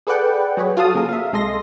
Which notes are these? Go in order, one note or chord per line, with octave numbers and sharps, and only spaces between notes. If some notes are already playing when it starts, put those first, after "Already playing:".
G#4 A4 B4 D5 F#5 G5
F#3 G#4 B4 C#5
F4 F#4 A4 F5 A5 D#6
C#3 A#3 G#4 A#4
E5 F5
C2 G#3 A4 D#5 C6 A#6